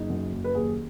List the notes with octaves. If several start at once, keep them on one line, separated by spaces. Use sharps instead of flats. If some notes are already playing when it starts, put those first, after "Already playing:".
Already playing: F#1 D#4
F#2
F#1
B4
D#2 G#4